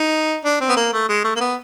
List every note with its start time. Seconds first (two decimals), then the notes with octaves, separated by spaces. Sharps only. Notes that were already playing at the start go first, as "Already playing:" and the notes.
Already playing: D#4
0.45 D4
0.61 C4
0.69 B3
0.77 A#3
0.93 A3
1.09 G#3
1.24 A3
1.36 A#3
1.40 B3